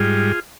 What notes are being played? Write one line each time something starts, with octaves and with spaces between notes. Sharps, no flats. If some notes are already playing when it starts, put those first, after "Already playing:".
Already playing: G#2 G3 F4 G#4